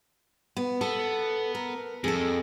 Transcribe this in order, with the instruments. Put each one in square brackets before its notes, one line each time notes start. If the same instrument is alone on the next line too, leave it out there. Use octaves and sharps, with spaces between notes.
[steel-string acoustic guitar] B3
[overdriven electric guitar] B3 [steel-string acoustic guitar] A4
[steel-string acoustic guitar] A#4
[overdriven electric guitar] F2 [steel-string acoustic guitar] G#4 A4